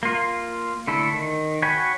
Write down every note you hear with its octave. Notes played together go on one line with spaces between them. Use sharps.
A#3 F4
D3 A3 E4 A4
D#3
F#4 C#5 G5 G#5 B5